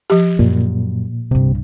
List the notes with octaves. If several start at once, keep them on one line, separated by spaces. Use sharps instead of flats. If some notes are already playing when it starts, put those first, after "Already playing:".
F3 G4
F#2 A#2
C2 G2 C3